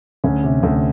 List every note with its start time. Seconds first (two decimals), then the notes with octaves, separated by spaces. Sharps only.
0.24 D2 C#4
0.44 C3
0.63 D2